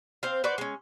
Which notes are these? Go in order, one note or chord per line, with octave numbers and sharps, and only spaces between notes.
C4 C5 F5
F#4 B4 C5 D5
G#3 C#4